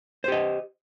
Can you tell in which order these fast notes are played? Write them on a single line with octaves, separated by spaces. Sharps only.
C5 G4 D#5